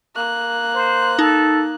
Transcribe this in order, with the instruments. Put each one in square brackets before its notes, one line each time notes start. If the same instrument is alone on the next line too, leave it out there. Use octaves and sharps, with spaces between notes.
[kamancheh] A#3 F#6
[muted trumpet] C5
[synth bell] D#4 [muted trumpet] A4